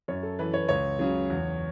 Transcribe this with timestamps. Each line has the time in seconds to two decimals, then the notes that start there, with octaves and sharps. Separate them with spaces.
0.08 F#2 C#5
0.23 A4
0.39 E3 B4
0.54 C#5
0.69 C#2 C#5
0.99 C#3 F#3
1.30 E2